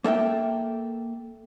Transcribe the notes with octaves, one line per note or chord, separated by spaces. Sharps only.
A#3 A4 E5 G5